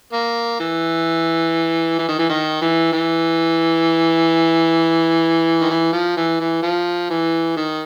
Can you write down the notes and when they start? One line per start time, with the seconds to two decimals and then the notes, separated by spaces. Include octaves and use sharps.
0.13 A#3
0.60 E3
1.99 E3
2.09 D#3
2.19 E3
2.30 D#3
2.62 E3
2.92 E3
5.61 D#3
5.70 E3
5.93 F3
6.17 E3
6.40 E3
6.63 F3
7.10 E3
7.57 D#3